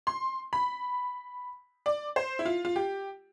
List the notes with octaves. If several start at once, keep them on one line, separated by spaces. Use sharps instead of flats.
C6
B5
D5
C5
E4
F4
F4
G4